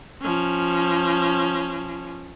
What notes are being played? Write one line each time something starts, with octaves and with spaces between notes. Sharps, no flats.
F3 C#4